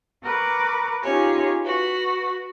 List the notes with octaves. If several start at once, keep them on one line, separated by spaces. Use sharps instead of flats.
A#4 B4 C#6 D6
C#4 D#4 F4 G4 G#4 C#5
F#4 B4